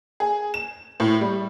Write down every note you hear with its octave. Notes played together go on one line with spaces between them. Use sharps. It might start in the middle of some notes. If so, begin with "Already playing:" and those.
G#4
E7
A2
G3